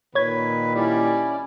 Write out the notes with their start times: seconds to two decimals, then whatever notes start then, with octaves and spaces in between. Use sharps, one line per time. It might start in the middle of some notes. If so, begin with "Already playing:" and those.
0.15 A#2 D#3 B4 C#5 G#6
0.75 G3 C#4 E4 D5